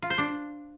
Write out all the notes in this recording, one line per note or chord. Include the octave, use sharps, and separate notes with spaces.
F4
C5
D4